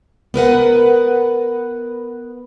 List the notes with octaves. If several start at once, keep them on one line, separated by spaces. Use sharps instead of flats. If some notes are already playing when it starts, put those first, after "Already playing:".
B3 A#4 B4 F#5